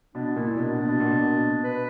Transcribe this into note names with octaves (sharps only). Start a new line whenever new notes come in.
B2 D4
A#2 E4
B2 D4
B2 D4
B2
A#2
B2
B4